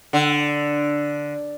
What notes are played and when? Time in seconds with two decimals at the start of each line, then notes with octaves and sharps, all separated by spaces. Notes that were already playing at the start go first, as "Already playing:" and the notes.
0.13 D3